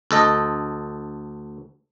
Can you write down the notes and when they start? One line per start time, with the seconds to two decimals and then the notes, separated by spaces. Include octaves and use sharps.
0.11 D2 A4 D#5